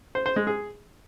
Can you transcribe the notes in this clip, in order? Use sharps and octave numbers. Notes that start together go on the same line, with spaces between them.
C5
C5
G#3
G#4